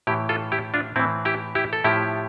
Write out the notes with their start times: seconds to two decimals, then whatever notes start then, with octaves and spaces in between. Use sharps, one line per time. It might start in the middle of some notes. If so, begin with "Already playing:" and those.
0.07 A2 E3 E4 G4
0.29 F4 A4
0.52 E4 G4
0.74 D4 F4
0.96 A2 E3 C4 E4
1.25 E4 G4
1.55 E4 G4
1.73 A4
1.84 A2 F3 E4 G4